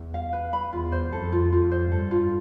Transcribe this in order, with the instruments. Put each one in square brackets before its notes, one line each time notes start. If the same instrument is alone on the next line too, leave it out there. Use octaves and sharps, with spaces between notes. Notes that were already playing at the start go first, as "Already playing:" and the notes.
Already playing: [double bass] E2
[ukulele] F5
B4
B5
[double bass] E2 [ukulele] F4
[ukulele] C5
[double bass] F2 [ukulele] A4
[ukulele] F4
[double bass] F2 [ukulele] F4
[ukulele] C5
[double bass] G2 [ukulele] A4
[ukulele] F4